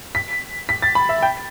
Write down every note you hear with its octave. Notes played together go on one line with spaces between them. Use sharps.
B6
B6
A6
B5
E5
G5